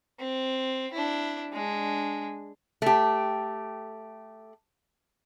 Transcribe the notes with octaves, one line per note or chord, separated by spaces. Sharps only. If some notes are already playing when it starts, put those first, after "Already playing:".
C4
D4 E4
G#3 D4
A3 G4